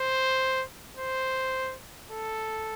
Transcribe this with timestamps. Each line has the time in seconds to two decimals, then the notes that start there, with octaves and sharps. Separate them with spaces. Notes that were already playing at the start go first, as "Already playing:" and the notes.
Already playing: C5
0.97 C5
2.11 A4